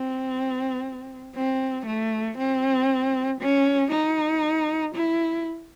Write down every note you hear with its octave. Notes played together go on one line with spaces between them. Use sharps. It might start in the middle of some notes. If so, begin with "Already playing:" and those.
Already playing: C4
C4
A3
C4
C#4
D#4
E4